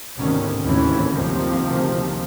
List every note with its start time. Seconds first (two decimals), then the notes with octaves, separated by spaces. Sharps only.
0.17 G#1 D2 C3 D#3 B3 C#4
0.61 F#1 D#2 A2 E3 C4 C#4
1.09 F#1 D2 C3 D#3 F3